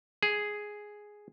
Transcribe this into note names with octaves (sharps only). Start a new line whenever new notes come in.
G#4